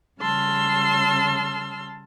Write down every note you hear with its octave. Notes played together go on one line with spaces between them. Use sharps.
C#3 G3 A5 C6 E6 F6